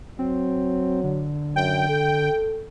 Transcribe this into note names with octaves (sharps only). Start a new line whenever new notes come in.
F#3 C4
D3
F#2 G5
A4